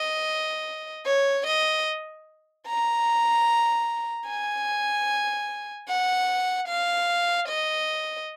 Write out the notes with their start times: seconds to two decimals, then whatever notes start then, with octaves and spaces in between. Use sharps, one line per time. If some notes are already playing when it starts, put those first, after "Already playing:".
Already playing: D#5
1.06 C#5
1.47 D#5
2.67 A#5
4.27 G#5
5.88 F#5
6.68 F5
7.48 D#5